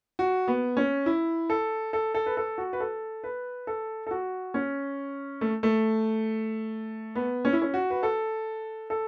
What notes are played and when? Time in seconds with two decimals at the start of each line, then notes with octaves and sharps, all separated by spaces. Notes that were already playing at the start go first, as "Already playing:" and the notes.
0.19 F#4
0.48 B3
0.77 C#4
1.06 E4
1.50 A4
1.93 A4
2.14 A4
2.26 B4
2.37 A4
2.58 F#4
2.73 B4
2.80 A4
3.24 B4
3.67 A4
4.07 A4
4.11 F#4
4.54 C#4
5.41 A3
5.63 A3
7.15 B3
7.45 C#4
7.53 E4
7.62 C#4
7.74 F#4
7.90 B4
8.03 A4
8.90 A4